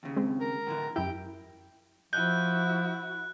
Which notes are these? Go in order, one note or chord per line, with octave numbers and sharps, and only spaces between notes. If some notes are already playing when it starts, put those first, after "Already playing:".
D#2 C#3
G#3 C4
A#4
A2 D3 E3
F#2 E4 G4 G5
F3 E4 F#4 F#6 G6